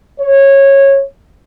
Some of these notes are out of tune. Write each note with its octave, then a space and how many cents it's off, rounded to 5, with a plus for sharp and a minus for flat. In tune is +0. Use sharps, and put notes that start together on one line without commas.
C#5 -15